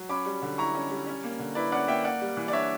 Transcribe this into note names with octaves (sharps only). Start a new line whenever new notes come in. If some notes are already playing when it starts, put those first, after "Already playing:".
Already playing: F#3
C#4 B5 D6
G3
D3
E4 A#5 C#6
C#4
G3
C#4
A#3
D3
E4 B4 D5
C#4 D5 F#5
A#3 E5 G5
A#3 D5 F#5
G3
E3
D5
D4 C#5 E5